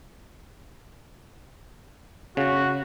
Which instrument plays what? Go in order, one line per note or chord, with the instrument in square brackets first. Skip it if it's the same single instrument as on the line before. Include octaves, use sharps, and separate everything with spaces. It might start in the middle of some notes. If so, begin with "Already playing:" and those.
[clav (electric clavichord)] C#3 [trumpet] F#4